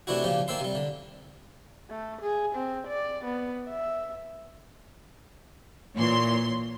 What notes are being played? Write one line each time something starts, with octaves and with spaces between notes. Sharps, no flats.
C3 E3 A3 D4 E4 F#4
A#2 C#3 F3 G4
D#3 A#3 C4 E5 C6
C3 G3
D3
A3
G#4
C4
D5
B3
E5
A#2 E3 C#5 C6